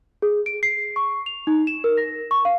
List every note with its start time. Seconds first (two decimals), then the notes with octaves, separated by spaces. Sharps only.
0.22 G#4
0.46 D7
0.63 C7
0.96 C#6
1.26 F7
1.47 D#4
1.67 E7
1.84 A#4
1.97 A#6
2.31 C#6
2.45 F5